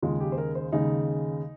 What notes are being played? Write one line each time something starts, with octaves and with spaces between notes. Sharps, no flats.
D#2 C#3 G#3 F4
G4
C5
A#4
C5
D#2 C#3 G#3 D#4